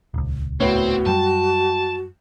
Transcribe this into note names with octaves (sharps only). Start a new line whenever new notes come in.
D#1 C#2
A2 B3 C4 F#4 C#5
F#2 G3 G5 A5